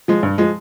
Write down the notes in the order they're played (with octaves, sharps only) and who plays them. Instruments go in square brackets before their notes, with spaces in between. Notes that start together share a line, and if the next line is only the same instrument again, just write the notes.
[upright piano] F3 G#3
G2
F3 G#3